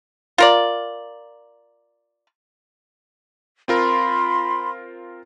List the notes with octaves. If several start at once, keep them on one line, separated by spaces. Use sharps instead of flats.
F4 A#4 D5
C4 F4 A#4 B5 C6